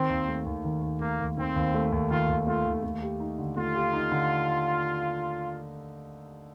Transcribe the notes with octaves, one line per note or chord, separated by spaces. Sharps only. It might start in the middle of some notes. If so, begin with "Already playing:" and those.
Already playing: D#3 C4
D#2
A3
D#2
D#3
D#2
A3 A#3
D#2
D#3 C4
D#2
A3
D#2
D#3 F4
D#2
A3 F4
D#2
A3
G4
D#4
D3
A3 F4
G4
D#4
D3